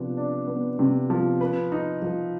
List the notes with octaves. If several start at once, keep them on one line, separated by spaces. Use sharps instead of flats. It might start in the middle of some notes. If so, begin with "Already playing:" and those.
Already playing: C3 F3 B3 D4
D4
B3
C3
F3
B4
D#4
F3